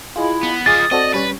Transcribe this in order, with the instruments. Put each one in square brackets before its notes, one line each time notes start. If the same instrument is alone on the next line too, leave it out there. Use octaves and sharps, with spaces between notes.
[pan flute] E4 [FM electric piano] F4 G#4 D#5
[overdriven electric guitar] B3
[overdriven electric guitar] F4 D#5 [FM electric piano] G#4 D6 C7 [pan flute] D#6 [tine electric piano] A6
[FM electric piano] C4 F#4 A4 [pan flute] D5 [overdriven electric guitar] D#5
[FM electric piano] G3 C#4 C#5 [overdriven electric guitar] B4